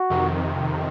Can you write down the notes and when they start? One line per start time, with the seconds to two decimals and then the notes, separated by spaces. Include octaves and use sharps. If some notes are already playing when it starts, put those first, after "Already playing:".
Already playing: F#4
0.10 F2 C3 D#3